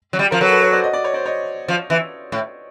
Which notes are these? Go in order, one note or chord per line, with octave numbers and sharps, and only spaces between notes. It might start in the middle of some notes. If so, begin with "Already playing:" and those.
F#3
G3
F3 A#4
F#3 A4 B4
A4 B4
B4 C#5
C5 D5
D#5
D5
C#5
C5 D5
C#5 D#5
F3
E3
A2